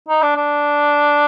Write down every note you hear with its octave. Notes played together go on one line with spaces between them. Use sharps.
D#4
D4
D4